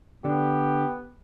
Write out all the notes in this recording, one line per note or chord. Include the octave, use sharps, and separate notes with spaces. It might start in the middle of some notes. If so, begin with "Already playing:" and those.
D3 B3 D4 G4